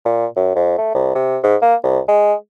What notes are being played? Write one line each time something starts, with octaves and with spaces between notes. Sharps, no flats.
A#2
F#2
F2
A3
C2
C3
G#2
A#3
C2
G#3